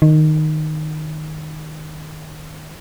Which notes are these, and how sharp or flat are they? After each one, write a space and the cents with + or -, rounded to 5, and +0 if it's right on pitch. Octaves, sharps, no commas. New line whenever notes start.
D#3 -10